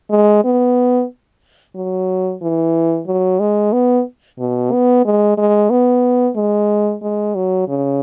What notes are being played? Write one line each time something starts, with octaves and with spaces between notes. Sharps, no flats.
G#3
B3
F#3
E3
F#3
G#3
B3
B2
B3
G#3
G#3
B3
G#3
G#3
F#3
C#3